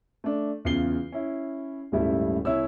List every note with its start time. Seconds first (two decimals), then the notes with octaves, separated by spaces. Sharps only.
0.24 A3 D4
0.65 E2 C#3 F4 C7 G7
1.12 C#4 E4
1.92 D#1 G#2 C#3 G3 A3 E4
2.45 C2 E4 C#5 E6